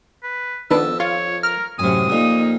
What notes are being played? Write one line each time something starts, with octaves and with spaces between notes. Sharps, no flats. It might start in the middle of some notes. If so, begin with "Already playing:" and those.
B4
F2 D#3 B3 D4 A5 E6
F4 C#5
A#4 F6
F#2 A2 C3 G#5 D#6
F2 A#2 A#3 D#4